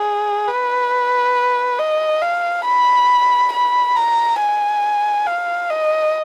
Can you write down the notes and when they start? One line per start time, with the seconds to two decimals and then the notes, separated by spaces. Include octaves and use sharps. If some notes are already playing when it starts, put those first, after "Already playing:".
Already playing: G#4
0.48 B4
1.79 D#5
2.22 F5
2.65 B5
3.53 B5
3.96 A#5
4.40 G#5
5.27 F5
5.70 D#5